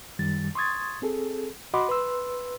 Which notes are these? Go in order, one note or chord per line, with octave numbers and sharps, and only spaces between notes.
F#2 D#3 G3 A6
C6 C#6 D#6 G#6 A6
C4 G#4 A4
F#4 D#5 F#5 B5 C6 D6
B4 C6 E6